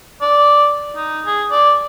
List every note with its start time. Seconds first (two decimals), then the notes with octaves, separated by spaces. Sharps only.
0.21 D5
0.96 D#4
1.26 G#4
1.51 D5